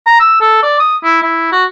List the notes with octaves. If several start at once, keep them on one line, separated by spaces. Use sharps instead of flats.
A#5
E6
A4
D5
D#6
E4
E4
F#4